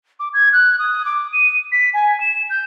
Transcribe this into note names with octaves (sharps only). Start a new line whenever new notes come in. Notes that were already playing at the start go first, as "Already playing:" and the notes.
D6
G#6
F#6
D#6
D6
D#7
B6
G#5
E7
G6